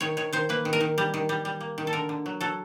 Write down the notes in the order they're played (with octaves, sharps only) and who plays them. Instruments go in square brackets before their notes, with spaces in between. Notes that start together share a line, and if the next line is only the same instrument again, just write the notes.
[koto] D#3 C#5
D#3 C#5
D#3 C5
A#3 B4
D#3
A#4
D#3
G3
D#3
G3
G3
A#3
D#3
A4
D3 A#4
D3
F#3
F#3 A4